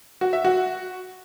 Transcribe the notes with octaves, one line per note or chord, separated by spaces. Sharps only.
F#4
E5
F#4